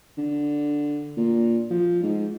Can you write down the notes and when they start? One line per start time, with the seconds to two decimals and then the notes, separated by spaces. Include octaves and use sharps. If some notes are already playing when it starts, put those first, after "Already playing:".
0.18 D3
1.16 A#2
1.70 F3
2.03 G#2